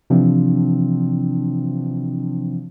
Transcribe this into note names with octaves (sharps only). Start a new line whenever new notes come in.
C3 E3 F3 C4 D4